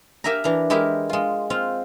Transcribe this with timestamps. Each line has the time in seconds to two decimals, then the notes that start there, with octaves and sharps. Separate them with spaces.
0.24 G4 A#4 E5 G#5 A#5
0.44 E3 D4 A#5
0.70 G#3 E4 G4 A#4
1.09 G#3 F4
1.50 C4 F4 F5